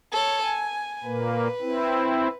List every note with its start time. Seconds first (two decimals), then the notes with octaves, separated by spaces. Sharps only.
0.13 A4 C#5
0.44 G#5
1.04 A#2 A#3 B4
1.61 C4 E4